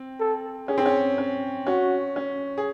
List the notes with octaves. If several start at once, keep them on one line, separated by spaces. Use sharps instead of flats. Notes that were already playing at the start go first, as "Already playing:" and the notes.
Already playing: C4
A4
C#4 G#4
C4
C#4
C#4
C#4 F#4
C#4
G#4